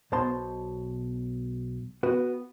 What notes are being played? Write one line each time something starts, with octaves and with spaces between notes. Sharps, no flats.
B1 B2 C5 A5 C6
B3 F#4 B4